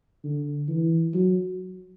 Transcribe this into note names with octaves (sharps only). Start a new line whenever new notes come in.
D3
E3
F#3